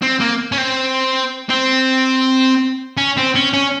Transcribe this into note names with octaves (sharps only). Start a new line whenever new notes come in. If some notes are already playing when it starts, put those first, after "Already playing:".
C4
A#3
C#4
C4
C4
C#4
C4
C#4
C#4